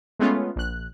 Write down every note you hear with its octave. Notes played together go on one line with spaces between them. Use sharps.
G#3 A3 B3 C#4 F4
A#1 F#6